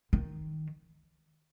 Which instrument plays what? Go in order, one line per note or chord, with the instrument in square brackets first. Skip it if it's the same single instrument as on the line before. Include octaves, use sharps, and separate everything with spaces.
[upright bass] D#3